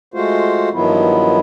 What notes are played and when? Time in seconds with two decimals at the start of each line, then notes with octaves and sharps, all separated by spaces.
0.14 G#3 A3 F4 F#4 C5
0.73 G2 D#3 F3 F#3 B3 E4